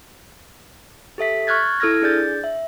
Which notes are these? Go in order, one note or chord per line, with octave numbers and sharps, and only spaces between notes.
G4 A4 E5 B6
C#6 F6 F#6 G#6 A6
E4 A4 E6 F6 G#6 A#6
D4 G#4 D5 G6 A6
E5